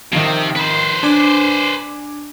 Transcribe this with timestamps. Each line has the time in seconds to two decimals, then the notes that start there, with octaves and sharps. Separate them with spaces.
0.13 C3 D#3 F3 C4
0.56 B4 C5
1.03 D4 G#5 D6